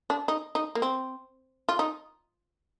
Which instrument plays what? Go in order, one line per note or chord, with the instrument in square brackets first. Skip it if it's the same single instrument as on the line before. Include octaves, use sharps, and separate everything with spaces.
[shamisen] D4
D#4
D#4
A#3
C4
F4
D#4